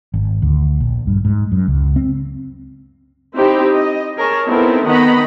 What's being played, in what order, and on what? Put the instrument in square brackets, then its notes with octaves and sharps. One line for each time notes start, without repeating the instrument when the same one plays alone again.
[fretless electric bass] G#1
D2
A#1
G2
G#2
F#2
C#2
C4
[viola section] C4 D#4 E4 G4 C5 G5
D#5
G#4 A#4 C#5 A5
B3 C4 D#4 E4 A4 A#4
D#3 B3 D#5 F#5 A#5 B5